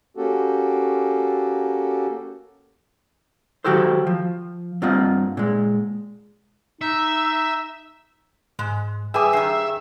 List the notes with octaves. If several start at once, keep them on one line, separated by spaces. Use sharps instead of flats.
A#3 C#4 F#4 G4 A4
D#3 F#3 F#4 G4 A4 C5
F3
G2 A#3 C4 F4 D#5 F#5
A#2 G#3
D#4 E5
G#2 G#3
G3 G#4 B4 E5 G5 G#5 D6 D#6
G2 D#3 C7